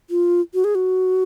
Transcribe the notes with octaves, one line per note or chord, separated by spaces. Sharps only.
F4
F#4
G#4
F#4